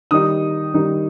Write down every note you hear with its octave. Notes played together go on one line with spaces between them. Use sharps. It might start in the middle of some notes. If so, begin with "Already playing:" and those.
D#3 G3 D#4 D#6
D#3 G3 D#4